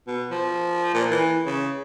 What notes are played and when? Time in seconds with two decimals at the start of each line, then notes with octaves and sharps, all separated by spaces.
0.07 B2
0.31 F3
0.94 A#2
1.10 E3
1.46 C#3